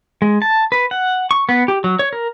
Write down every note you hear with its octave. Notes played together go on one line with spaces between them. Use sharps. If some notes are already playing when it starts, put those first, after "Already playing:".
G#3
A5
B4
F#5
C#6
B3
G4
F#3
C#5
A#4